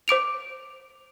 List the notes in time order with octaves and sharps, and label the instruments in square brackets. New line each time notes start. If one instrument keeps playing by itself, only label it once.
[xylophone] C5 D6 D7 F7